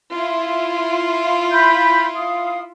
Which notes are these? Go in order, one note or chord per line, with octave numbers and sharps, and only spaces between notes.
E4 F4
B5 G6
F5 D#6